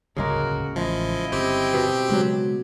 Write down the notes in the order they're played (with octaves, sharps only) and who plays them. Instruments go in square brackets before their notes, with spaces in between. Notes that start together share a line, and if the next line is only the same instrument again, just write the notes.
[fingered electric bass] D1 G1 C#2 [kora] C#3 G#3 A#3 [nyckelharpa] F#4 A#4
[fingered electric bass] A1 [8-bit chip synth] F3 [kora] G#3 [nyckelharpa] E4 D#5
[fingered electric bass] G1 [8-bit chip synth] C4 G4
[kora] B2 B3
[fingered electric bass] C#3 G#3 [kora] F#3 F#4